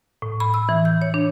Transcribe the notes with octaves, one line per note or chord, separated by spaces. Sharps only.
A2
B5
E6
E3
G6
C#5
D4